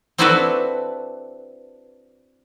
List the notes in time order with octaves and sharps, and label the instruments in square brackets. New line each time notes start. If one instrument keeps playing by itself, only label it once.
[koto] C4 D4 E4 F#4 A4 B4